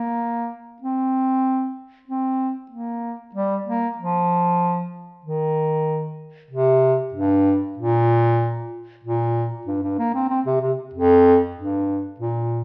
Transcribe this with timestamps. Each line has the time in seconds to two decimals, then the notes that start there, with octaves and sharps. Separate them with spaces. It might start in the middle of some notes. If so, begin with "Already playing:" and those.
Already playing: A#3
0.82 C4
2.08 C4
2.71 A#3
3.35 G3
3.66 A#3
3.98 F3
5.24 D#3
6.51 C3
7.14 G2
7.78 A#2
9.04 A#2
9.67 G2
9.83 G2
9.99 A#3
10.15 C4
10.29 C4
10.46 C3
10.61 C3
10.93 F2
11.56 G2
12.20 A#2